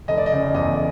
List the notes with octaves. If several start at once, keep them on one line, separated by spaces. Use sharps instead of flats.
F1 D#5
D5
D#5
C#3
E2 D#5